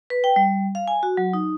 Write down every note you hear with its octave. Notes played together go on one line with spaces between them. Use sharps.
B4
G5
G3
F5
G#5
F#4
F#3
D#4